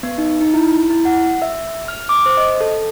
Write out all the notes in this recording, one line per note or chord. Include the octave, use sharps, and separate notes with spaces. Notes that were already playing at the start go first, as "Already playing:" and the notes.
B3
D#4
D#4
E4
E4
F#5
E5
F6
D6
C5
D#5
A4